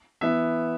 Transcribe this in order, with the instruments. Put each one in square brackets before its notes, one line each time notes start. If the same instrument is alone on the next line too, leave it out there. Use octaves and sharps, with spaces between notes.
[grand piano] E3 B3 E5